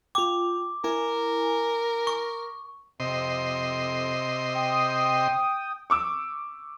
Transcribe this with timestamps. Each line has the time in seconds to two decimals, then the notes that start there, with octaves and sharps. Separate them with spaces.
0.15 F4 G5 D6
0.84 E4 A#4 G#5
2.07 C#6
3.00 F2 C3 D#5 C6
4.55 G5 D#6
5.90 C#6 D6 E6